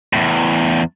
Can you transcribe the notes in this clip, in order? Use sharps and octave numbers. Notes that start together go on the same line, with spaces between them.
E2 A2